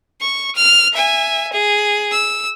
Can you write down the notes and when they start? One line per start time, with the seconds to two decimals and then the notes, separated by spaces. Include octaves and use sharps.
0.21 C#6
0.56 F6
0.93 E5 G#5
1.53 G#4
2.12 E6